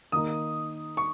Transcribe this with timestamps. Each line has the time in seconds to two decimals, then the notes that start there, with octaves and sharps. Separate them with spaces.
0.12 D#3 A#3 D#4 D#6
0.97 C#6